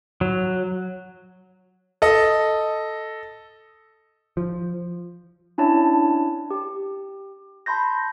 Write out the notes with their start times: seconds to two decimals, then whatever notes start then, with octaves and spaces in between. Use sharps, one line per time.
0.21 F#3
2.02 A4 D#5
4.37 F3
5.58 C#4 D4 E4 C#5 A5
6.51 G4
7.66 A5 B5 C6 G6 A#6